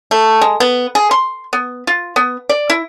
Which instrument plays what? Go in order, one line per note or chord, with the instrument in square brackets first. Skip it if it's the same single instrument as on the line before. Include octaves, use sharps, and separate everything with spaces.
[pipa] A3
G#3
B3
G#4
C6
B3
F4
B3
D5
E4